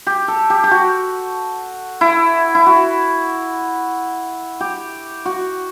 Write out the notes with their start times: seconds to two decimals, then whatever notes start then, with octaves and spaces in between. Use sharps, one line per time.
0.06 G4
0.28 A4
0.50 G4
0.63 G4
0.71 F#4
2.01 E4
2.55 E4
2.66 F#4
4.60 G4
5.25 F#4